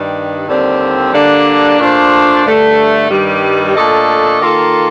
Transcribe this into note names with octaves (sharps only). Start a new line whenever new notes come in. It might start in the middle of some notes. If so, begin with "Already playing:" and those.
Already playing: G2 D#3 G3
D#2 D3 G3 C4
D3 G3 A#3 D4
A#2 A3 D4 F4 C5
G2 D3 A3
G2 D#3 G3
A#2 A3 D4 A4 D#5
D#3 A#3 F4 A4